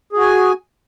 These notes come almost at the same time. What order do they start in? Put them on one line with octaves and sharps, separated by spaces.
G#4 F#4 G#5